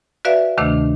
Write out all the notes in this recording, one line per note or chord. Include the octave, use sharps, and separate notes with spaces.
F#4 B4 D5 E5 F5
D2 C3 D#3 A3 D4